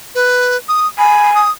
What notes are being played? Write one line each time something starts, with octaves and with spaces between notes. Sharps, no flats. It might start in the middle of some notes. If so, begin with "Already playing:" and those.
B4
D#6
G#5 B5
D#6